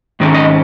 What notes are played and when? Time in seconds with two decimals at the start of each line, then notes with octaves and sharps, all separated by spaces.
0.20 G#2 D#3 G#3 C#4
0.34 D#5